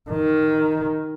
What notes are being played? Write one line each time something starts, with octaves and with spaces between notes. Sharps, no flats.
D#3